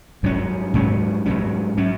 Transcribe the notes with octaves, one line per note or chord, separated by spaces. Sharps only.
G#2 F#3 C#4
G#2 F#3 C#4
G#2 F#3 C#4
F#3 C#4